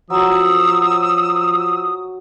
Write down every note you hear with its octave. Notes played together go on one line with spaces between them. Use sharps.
F3 F#3 D#6 E6